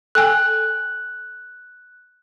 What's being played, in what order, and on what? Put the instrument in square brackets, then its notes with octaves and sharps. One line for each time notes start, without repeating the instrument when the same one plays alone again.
[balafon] A4 G5 G#5 [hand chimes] F#6